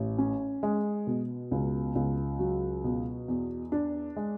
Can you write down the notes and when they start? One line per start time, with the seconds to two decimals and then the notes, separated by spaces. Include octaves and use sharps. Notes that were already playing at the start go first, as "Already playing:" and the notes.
Already playing: A1
0.18 C#4
0.63 G#3
1.07 B2
1.51 C#2
1.95 C#2
2.39 F#3
2.84 B2
3.28 E2
3.72 D4
4.16 G#3